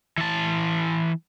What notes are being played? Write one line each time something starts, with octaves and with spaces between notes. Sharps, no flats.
E3 A5